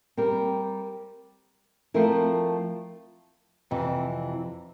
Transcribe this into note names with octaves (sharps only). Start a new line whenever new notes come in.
G3 C4 G4 A#4
F3 A3 C4 E4 A#4
F2 C3 E3